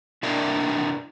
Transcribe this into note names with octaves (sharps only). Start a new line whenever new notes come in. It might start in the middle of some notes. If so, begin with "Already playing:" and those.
C3 D4 E4 A#4